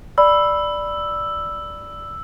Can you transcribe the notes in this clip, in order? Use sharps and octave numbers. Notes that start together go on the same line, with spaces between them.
D5 B5 E6